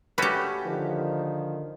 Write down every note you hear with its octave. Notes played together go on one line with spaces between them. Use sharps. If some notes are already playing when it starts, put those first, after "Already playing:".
A3 C#4 F#4 G4 B4
D3 D#3 F3